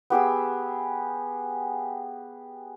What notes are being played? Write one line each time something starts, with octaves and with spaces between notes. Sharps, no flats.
B3 G4 G#4 E6